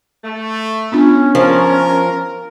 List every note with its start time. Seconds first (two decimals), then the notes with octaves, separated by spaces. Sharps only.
0.24 A3
0.92 B3 C#4 D4 F4
1.35 F3 A#4